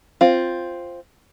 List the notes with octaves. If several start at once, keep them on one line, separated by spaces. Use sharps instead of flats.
C4 F4